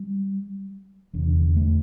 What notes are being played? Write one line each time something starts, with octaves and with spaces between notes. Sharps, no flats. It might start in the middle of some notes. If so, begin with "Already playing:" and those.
Already playing: G3
F1 E2 D3
A3